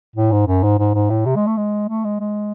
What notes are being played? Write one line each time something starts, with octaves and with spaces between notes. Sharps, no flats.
A2
G#2
F#2
G#2
G#2
G#2
A2
C3
G#3
A3
G#3
A3
G#3
G#3